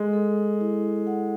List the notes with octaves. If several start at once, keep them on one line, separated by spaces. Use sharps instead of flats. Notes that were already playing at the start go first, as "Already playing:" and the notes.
Already playing: G#3 A4
A4
E4
F#5